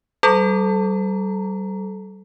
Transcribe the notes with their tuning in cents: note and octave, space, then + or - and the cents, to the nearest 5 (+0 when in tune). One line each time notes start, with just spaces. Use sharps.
G3 -35 A4 -20 A#5 +0